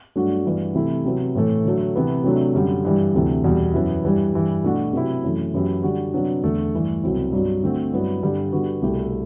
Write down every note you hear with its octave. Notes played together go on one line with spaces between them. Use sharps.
G2 F#3 A3 D4 F#4
G2 E3 B3 D4 F#4
C3 E3 A3 E4
C3 F#3 B3
A2 E3 A3
D3 F#3 A3
C3 E3 B3
C3 F#3 A3 D4
F#2 D3 G3
G2 E3 G3
D2 C3 E3
E2 B2 G3
F#2 E3 B3 E4
G2 E3 G3
G2 E3 G3
B2 A3 D4 F#4
C3 F#3 B3 E4 G4
F#2 E3 A3
F#2 E3 B3 E4 G4
D3 G3 D4 F#4
C3 F#3 B3 D4 F#4
E2 D3 A3
G2 E3 A3
C2 B2 F#3 C4 E4
G2 F#3 B3 F#4
D3 A3 C4 F#4
G2 F#3 B3 E4
G2 D3 G3
D3 G3 B3 F#4
C2 B2 A3 E4 G4